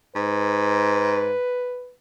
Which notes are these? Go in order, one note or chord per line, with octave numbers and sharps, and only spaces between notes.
G#2 B4